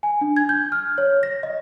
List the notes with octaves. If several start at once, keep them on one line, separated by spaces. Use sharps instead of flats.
G#5
D4
G#6
G6
F6
C#5
A#6
D#5